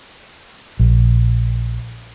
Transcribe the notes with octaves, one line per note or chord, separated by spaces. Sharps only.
A#1